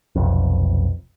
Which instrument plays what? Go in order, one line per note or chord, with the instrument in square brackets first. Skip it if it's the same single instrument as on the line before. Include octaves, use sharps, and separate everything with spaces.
[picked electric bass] F1 B1 F2